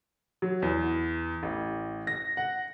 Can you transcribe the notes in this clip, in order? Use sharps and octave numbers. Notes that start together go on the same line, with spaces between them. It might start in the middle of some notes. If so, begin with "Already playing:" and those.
F#3
E2
A1
A#6
F#5